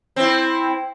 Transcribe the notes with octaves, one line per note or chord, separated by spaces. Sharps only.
C4 E4